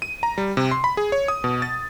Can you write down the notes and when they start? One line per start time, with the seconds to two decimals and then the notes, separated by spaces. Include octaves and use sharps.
0.02 D#7
0.23 A#5
0.38 G3
0.57 C3
0.71 C6
0.84 B5
0.97 G#4
1.12 C#5
1.28 D#6
1.44 B2
1.62 A6